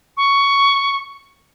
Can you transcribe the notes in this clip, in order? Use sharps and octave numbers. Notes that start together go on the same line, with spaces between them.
C#6